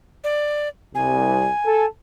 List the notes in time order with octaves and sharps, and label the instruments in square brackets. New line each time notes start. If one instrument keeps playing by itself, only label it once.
[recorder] D5
[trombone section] C2 [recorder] G#5
[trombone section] A4